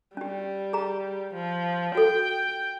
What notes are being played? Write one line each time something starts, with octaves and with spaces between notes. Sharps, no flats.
G3 C#4 G4
G#4 A#5
F3
F#4 A4 G5